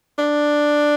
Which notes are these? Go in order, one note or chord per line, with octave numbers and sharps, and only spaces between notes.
D4